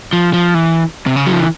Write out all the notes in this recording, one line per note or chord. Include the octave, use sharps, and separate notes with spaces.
F3
F3
E3
C3
C#3
F#3
F3
E3